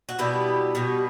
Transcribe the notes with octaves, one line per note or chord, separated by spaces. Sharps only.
F#4
B2 G3 B3 E4 G4
B2 G3 B3